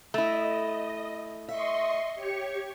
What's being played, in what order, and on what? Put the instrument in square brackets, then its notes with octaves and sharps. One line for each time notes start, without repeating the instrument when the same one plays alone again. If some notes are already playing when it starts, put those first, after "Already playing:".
[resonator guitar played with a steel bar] A3 E4 [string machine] D#5
[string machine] D#5 C6 C#6 [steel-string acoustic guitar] E5
[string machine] G4 C#5 C#6